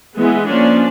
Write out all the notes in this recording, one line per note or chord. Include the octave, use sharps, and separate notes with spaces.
E3 G#3 B3
F3 A#3 C#4 D4